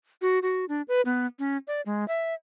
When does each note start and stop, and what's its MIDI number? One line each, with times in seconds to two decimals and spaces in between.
0.22 0.39 66
0.42 0.65 66
0.69 0.82 62
0.88 1.01 71
1.05 1.27 59
1.39 1.57 61
1.68 1.81 74
1.86 2.07 56
2.08 2.34 76